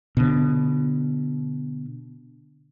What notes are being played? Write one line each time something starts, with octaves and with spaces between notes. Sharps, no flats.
B2 D3